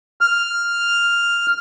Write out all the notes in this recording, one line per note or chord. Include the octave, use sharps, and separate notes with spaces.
F6